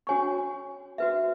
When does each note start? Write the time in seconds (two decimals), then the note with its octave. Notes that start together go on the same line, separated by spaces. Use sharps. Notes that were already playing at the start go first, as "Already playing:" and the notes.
0.07 C#4 F#4 C#5 G#5 C#6
0.98 F#4 B4 E5